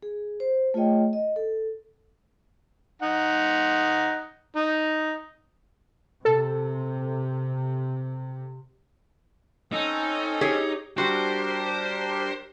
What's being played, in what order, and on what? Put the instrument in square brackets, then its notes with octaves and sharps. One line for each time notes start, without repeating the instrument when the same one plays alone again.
[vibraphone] G#4
C5
A3 F4 G#4 C#5 D#5 G5
D#5
A4
[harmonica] D#4 F#5
D#4
[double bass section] C3 [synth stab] A4
[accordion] C4 C#4 A4 [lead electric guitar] D#4
[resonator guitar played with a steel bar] G4 G#4 C#5
[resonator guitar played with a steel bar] G3 F#4 [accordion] D4 G4 A#4 [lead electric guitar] C5